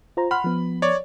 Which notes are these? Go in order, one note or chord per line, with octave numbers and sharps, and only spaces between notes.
F4 C5 A#5
F#5 B5 C6 F6
F3 B3
C#5 D5